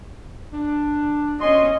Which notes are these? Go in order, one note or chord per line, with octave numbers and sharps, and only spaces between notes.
D4
C#4 F#4 D#5 G#5 C6